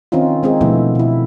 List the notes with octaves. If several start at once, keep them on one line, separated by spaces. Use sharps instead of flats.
D#3 C4 C#4 D#4 F4
G#3 C4 D#4 G#4
B2 D3 F3 A3 B3 E4
B2 E4